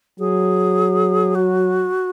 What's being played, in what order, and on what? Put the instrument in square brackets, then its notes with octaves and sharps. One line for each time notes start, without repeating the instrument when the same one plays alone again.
[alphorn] F#3 [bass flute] G#4
[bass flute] F#4